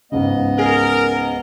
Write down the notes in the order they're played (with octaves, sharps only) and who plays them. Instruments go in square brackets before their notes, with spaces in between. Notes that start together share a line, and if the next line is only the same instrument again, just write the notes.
[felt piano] C#2 G#2 C#3 [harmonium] B3 D#5
[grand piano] G#4 [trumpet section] A#4